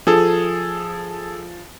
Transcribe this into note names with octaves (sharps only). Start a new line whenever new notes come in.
F3 G#4 A4